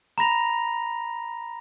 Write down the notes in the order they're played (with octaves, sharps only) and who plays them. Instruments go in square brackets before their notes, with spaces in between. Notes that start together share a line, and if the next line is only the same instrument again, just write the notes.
[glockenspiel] A#5 B5 A#6 F7